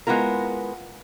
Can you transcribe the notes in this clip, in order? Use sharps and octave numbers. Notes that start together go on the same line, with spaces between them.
G#3 B3 E4 F4 A#4